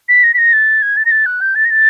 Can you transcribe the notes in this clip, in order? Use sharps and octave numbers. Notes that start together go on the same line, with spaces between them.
B6
A#6
B6
A#6
A6
G#6
A6
A#6
A6
F#6
G6
A6
A#6
A6